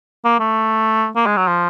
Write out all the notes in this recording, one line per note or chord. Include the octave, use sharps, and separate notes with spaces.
A#3
A3
A#3
G#3
F#3
F3